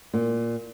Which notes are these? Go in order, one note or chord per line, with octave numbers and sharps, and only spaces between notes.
A#2